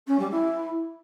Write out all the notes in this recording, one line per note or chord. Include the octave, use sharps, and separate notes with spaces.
C#4
G3
E4